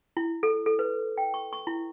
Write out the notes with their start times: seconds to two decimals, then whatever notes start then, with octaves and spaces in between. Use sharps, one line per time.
0.17 E4
0.43 A4
0.66 A4
0.79 B4
1.18 G5
1.34 C#6
1.53 C#6
1.67 E4